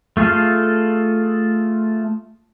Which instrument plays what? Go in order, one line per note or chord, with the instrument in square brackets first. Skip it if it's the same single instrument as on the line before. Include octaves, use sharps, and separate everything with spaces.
[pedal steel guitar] A3 F4 G#4 A4 F5